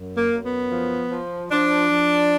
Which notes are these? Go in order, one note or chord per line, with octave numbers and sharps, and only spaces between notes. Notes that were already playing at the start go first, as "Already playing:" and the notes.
Already playing: F#2
A#3
F#2
B3
F3
F3
F3 D4
F3